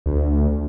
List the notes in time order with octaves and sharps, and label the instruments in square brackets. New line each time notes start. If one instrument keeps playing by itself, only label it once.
[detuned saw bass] D2